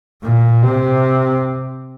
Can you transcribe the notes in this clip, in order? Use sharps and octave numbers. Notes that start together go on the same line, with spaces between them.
A#2
C3